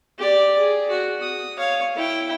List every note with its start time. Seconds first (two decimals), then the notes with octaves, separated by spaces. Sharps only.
0.18 G4 D5
0.58 G#4
0.90 F#4
1.21 D#6
1.58 C#5 F5
1.96 E4 G5